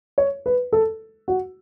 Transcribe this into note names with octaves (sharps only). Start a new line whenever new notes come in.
C#5
B4
A4
F#4